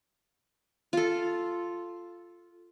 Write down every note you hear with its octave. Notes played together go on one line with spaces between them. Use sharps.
F4 A4